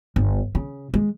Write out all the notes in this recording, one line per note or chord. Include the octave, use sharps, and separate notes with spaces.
G1
C#3
G#3